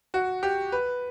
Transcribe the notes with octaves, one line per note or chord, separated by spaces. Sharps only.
F#4
G4
B4